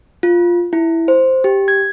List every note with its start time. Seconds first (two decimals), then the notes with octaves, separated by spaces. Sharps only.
0.23 F4
0.73 E4
1.08 C5
1.44 G4
1.68 G#6